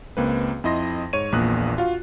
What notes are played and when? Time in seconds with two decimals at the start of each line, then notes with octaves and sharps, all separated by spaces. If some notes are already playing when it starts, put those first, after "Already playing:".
0.17 C#2 A#3 C4 B4
0.64 F2 E4 D#5 C6 A#6
1.13 G#2 C#5 D#7
1.32 A#1 E2 A#2 A#3 D#6 F#6
1.78 F4 F#4 F5